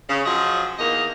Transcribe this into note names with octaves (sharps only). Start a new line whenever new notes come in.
C#3
F3 F#3 G#3 G#4
E2 D#3 A#3 D#5